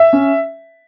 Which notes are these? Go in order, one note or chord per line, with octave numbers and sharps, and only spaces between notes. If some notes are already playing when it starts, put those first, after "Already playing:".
Already playing: E5
C#4